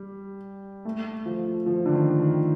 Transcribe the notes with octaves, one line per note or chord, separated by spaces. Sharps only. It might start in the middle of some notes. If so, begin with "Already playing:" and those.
Already playing: G3
A3
F3
F3
D3
D#3
D#3